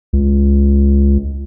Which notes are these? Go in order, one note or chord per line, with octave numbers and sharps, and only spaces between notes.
C#2